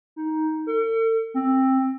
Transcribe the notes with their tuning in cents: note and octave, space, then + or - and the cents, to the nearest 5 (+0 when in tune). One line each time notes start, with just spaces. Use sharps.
D#4 +10
A4 +45
C4 +15